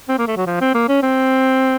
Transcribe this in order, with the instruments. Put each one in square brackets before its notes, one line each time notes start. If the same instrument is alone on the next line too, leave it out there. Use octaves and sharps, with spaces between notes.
[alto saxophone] C4
A#3
A3
F#3
F3
C4
A#3
C#4
C4